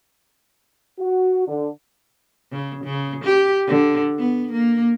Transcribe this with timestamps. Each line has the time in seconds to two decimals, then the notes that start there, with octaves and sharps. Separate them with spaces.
0.99 F#4
1.47 D3
2.51 C#3
2.84 C#3
3.24 G4
3.67 D3
4.19 B3
4.52 A#3